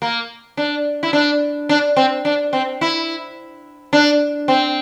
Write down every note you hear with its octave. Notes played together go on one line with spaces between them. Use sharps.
A#3
D4
E4
D4
D4
C4
D4
C4
E4
D4
C4